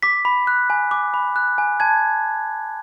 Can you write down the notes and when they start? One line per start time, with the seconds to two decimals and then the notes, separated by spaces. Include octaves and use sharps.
0.03 D6 B6
0.25 B5
0.47 F#6
0.70 G#5
0.91 D6
1.14 B5
1.36 F#6
1.58 G#5
1.80 A5 G#6